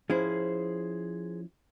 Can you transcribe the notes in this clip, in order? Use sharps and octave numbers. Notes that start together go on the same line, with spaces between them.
F3 C#4 E4 G#4 C5